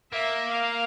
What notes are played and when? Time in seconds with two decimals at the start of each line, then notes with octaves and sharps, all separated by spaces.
0.12 A#3 E5
0.51 F5